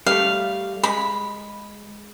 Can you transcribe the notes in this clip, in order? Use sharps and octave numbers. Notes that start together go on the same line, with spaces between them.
G3 A3 F5
G#3 B5